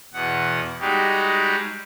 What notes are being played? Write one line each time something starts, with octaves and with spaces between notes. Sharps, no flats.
E2 B2 F#5
G3 G#3 D#4 F#4 G4